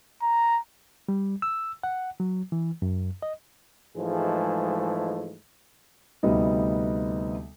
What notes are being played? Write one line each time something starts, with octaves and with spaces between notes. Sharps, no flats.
A#5
G3
E6
F#5
F#3
E3
F#2
D#5
G#2 E3 F3 G#3 A3
D2 C3 G3 B3 D#4 D#5